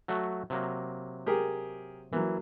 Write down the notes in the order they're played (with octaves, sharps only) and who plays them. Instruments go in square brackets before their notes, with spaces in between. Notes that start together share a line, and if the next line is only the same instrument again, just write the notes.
[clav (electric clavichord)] F#3 A3 F#4
C3 F#3 A#3
[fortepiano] G4 G#4 A#4
[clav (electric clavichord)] E3 [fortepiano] F#3 A#3